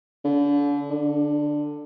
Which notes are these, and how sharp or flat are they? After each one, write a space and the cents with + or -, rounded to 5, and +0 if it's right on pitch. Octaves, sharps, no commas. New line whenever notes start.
D3 -35
D3 +10